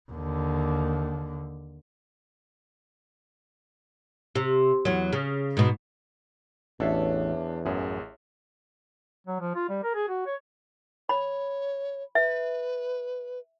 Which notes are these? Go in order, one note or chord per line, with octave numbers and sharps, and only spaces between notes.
D#2 D3
C3
E2 F#3
C#3
G#2 B2
A1 E2 D4 A4 C#5 E5 F5
A1 F#2 G#4
F#3
F3
F4
G3
A#4
G#4
F#4
C#5
C#5 B5
B4 E5